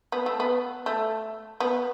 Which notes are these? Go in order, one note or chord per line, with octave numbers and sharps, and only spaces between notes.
B3
A3
B3
A3
B3